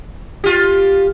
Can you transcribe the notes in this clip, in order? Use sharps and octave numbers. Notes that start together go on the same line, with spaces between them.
F4 G4